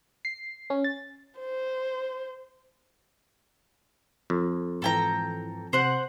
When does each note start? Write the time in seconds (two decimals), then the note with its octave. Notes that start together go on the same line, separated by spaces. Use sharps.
0.25 C7
0.70 C#4
0.84 A6
1.40 C5
4.30 F2
4.82 G#2 E3 A4 G5 A#5
5.73 C3 C5 F#5